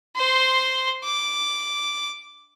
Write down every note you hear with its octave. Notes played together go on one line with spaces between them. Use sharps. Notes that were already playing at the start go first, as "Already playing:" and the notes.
C5 C6
D6